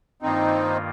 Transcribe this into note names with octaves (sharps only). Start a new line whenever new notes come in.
G2 D#3 A#3 C4 D#4 F4